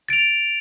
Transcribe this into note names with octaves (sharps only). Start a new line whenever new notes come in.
A6 D7 F7